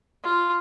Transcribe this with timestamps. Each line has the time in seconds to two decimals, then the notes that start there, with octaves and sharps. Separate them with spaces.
0.24 F4